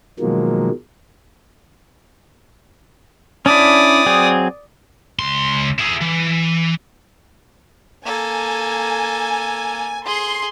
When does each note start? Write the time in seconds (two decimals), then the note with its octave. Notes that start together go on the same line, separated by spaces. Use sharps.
0.20 B2 D#3 F3 F#3 G#3 A#3
3.46 C#4 D4 E4 D5 D#6
4.06 F#3 C4 G#4
5.19 C#2 C6
5.79 E4 G#4
6.01 E3
8.05 A#3 A4 G#5
10.05 G#4 C6